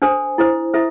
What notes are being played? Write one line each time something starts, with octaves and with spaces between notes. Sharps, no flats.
D4 A4 C5 G#5
E4 A4 C5
E4 A4 C5 E5